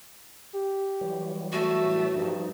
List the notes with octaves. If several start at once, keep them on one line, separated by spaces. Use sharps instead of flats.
G4
E3 F#3 G3
A3 F#4
A2
G2 F3 D#4